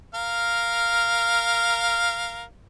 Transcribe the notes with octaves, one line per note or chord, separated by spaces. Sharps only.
A#4 F5